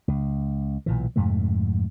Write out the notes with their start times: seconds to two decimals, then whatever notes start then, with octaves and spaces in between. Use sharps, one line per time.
0.08 C#2
0.86 B1 A#2 E3
1.16 F2 G#2 C3 A3